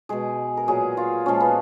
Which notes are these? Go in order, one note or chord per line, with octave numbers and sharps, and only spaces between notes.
B2 G#3 G#4
A#4
A#2 F#3 G#4
F4
A#2 F3 G#3 C#4
B3